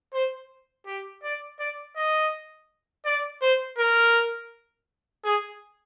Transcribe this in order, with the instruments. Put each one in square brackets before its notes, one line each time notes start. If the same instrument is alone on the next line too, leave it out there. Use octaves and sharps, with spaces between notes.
[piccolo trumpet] C5
G4
D5
D5
D#5
D5
C5
A#4
G#4